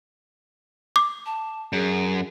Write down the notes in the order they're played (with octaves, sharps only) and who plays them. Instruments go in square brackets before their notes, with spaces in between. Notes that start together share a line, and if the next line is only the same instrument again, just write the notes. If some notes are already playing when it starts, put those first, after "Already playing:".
[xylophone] D6
[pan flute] A5
[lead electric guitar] F#2 [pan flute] G#4